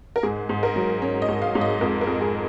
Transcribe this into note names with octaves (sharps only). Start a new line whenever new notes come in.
A#4
G#2 G#4
G#2
A#4
F#3
C#4 C#5
D#5
G#2
F5
G#2
D#5
F2 A#4
A#4
F2
G#4